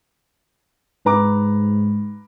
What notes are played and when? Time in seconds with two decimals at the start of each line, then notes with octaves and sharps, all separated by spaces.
1.06 G#2 B4 A#5 D6